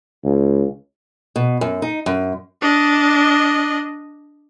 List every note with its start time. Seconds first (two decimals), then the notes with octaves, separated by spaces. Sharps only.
0.24 C#2
1.36 B2
1.61 F#2
1.82 D#4
2.06 F#2
2.62 D4 D#5